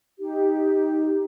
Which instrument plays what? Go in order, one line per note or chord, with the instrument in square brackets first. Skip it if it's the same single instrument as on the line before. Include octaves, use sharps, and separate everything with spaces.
[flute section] D#4 G4